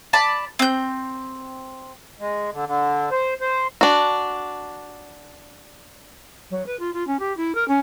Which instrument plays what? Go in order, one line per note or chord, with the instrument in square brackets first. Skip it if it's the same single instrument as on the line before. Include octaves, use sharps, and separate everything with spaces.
[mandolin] D5 A5 B5
C4 G6
[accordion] G#3
D3
D3
C5
C5
[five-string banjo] D4 F#4
[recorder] F#3
B4
F4
F4
C#4
G4
E4
A#4
C#4